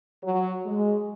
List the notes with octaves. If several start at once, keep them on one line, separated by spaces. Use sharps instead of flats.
F#3
G#3